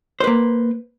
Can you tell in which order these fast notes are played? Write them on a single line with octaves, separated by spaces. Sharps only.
C5 B4 A#3